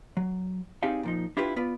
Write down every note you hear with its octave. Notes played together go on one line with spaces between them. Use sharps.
F#3
C4 D#4 G4 G#4 D5 F5
A#2 F3 D#4
D4 E4 F4 G4 B4
B3 F4 B4 D5